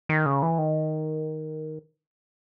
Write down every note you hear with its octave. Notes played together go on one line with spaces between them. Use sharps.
D#3
C#3
E3
D#3